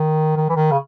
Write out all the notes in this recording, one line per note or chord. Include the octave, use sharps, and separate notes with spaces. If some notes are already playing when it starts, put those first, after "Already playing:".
Already playing: D#3
D#3
E3
D#3
C#3